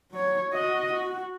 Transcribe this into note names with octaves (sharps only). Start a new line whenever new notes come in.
F#3 C#5
F#4 D#5
F#4